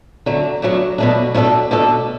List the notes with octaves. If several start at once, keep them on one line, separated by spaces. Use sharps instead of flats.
D3 F#3 A3
B2 F#3 A3 D4
B2 F#3 A3 D4
B2 A3 D4 A4
B2 A3 D4 A4